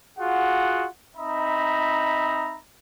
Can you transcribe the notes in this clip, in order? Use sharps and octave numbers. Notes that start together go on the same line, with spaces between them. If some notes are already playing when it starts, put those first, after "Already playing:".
F4 F#4 G#4 F#5
C4 D#4 D#5 E5 A#5 B5